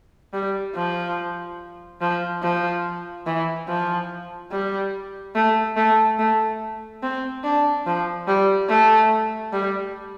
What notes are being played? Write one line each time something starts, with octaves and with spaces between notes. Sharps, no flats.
G3
F3
F3
F3
E3
F3
G3
A3
A3
A3
C4
D4
F3
G3
A3
G3